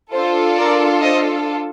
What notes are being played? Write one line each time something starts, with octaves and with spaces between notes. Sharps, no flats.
D4 F4 A4 C5
A#4 D5
C5 D#5